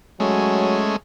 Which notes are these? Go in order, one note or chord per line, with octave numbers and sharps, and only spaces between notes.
F#3 G#3 A3 C#4